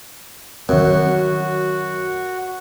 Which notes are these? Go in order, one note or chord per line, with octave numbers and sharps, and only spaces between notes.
F#2 D#3 C4 F#4